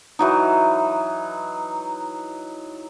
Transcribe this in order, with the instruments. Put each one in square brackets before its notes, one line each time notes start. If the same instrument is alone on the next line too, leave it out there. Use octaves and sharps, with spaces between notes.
[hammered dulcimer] E3 F#3 D#4